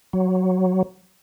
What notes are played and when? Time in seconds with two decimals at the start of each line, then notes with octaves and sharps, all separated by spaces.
0.13 F#3